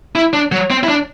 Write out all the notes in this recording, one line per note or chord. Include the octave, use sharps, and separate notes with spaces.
E4
D4
F#3
C4
E4
D4